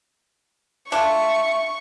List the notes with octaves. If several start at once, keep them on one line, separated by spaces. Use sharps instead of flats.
D4 F4 E5 C#6